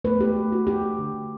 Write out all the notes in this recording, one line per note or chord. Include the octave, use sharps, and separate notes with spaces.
A3 B4
G4
A3
F#4
A3 G4
D3